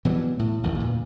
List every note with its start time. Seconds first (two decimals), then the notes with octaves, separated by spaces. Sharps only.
0.05 B2 E3 F#3 G3
0.39 A2
0.63 A1 E2 D#3
0.78 D2 G2 A#2